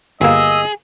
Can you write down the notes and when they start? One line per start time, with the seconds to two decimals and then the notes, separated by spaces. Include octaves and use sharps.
0.21 G1 A#3 G#4 D#5 E6